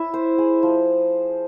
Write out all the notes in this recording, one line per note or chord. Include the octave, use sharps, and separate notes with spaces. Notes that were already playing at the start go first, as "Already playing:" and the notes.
Already playing: E4 E5
C5
G#4
F3